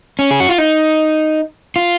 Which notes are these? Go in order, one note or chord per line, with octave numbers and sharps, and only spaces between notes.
C#4
G#4
F#4
F4
D#4
F4